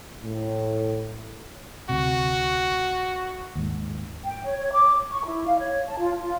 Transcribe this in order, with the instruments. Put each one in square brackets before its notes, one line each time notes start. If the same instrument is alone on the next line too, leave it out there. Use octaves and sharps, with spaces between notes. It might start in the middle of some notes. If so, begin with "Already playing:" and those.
[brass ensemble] A2
[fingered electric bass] D2 C3 [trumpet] F#4
[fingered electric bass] D#2 G#2
[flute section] G5
C#5
C#5
D6
C#6
E4
F5
C#5
A5
F4
F4